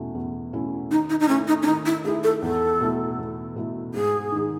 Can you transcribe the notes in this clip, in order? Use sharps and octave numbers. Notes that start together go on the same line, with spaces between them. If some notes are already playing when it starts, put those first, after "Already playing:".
Already playing: E2 B2 A3 C#4 E4
E2
B2 A3 C#4 E4
D#3 D#4
D#4
D#4
A3 C#4 E4
D#4
C#4
D#3 D#4
E4
A3 E4 G#4
A4
E2 A4
B2 A3 E4
E2
B2 A3 E4
G#2 G#4
D#3 G#3 D#4